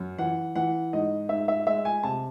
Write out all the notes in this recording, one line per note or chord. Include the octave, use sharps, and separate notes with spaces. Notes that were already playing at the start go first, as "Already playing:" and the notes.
Already playing: F#2
E3 F#5
E3 F#5
G#2 D#5
G#2 E5
E5
G#3 E5
G#5
C3 A5